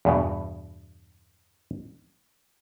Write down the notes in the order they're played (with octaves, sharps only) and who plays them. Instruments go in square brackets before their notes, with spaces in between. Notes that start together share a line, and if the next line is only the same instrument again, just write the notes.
[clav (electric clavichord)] E2 G2 B2